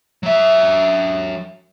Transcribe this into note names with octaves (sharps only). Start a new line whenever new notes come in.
F#3 E5